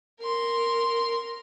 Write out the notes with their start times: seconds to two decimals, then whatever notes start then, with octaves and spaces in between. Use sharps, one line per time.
0.20 A#4 C6